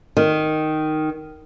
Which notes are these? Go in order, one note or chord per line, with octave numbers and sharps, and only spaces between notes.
D#3